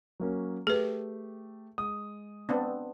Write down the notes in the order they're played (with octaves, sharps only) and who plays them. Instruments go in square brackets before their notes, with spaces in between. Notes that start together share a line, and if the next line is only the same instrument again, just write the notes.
[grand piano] F#3 A#3 C#4
[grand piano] A3 G4 [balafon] G#4 B4
[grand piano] G#3 D#6
[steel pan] B3 C4 D4